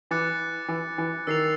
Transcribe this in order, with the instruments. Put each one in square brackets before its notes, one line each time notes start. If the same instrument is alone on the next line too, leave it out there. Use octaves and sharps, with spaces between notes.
[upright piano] E3 [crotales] D6 F#6 A6 C#7
[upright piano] E3
E3
[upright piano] D#3 [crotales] E6 A6 C7 F7